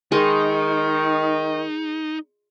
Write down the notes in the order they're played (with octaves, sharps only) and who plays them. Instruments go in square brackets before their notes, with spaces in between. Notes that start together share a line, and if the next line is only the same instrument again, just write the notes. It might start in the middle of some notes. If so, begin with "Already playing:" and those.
[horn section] D#3 [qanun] G#3 [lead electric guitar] D#4